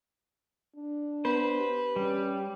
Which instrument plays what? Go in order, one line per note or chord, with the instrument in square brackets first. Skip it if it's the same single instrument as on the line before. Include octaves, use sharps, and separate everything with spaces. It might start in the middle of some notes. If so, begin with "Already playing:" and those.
[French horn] D4
[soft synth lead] B3 [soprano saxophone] B4 [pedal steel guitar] C5
[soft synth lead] G4
[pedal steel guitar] G3 [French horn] C#4